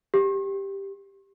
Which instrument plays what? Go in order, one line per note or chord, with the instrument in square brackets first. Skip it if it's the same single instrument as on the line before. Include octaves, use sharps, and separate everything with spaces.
[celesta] G4